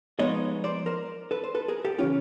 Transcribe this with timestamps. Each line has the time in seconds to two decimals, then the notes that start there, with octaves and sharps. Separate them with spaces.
0.19 F3 G#3 B3 D#4 C#5 D#5
0.64 C5 D5
0.86 A#4 C5
1.31 A4 B4
1.44 C5
1.55 A4 B4
1.68 G#4 A#4
1.85 G4 A4
1.98 C#3 E3 G#3 C#4 F4 G4